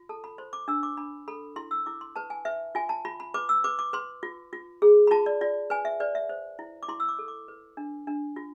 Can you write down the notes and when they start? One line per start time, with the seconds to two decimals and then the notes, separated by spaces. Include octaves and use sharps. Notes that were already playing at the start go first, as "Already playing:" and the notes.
Already playing: F4
0.09 A4 A5
0.24 B5
0.38 C5 C6
0.53 D6
0.68 D4 E6
0.83 D6
0.97 D4 B5
1.28 A4 B5
1.56 E4 C6
1.71 E6
1.86 E4 D6
2.01 C6
2.16 B4 A5
2.30 G#5
2.45 B4 E5
2.75 F4 G#5
2.89 A5
3.05 F4 B5
3.20 B5
3.34 B4 D6
3.49 E6
3.64 B4 D6
3.79 D6
3.93 B4 C6
4.23 F4
4.53 F4
4.82 G#4
5.07 B5
5.11 F4 A5
5.26 D5
5.41 F4 D5
5.70 B4 G#5
5.85 E5
6.00 B4 D5
6.15 E5
6.29 C5
6.59 E4
6.83 D6
6.88 E4 C6
7.00 E6
7.08 D6
7.19 A4
7.28 D6
7.48 B4
7.77 D4
8.07 D4
8.36 F4